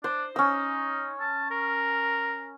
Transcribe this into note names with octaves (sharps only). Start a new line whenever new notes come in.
D4 C5
C#4 D#4 E6
A5
A#4